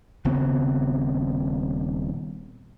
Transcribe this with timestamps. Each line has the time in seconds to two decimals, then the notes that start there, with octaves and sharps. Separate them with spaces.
0.25 D#1 C#3 B3 C4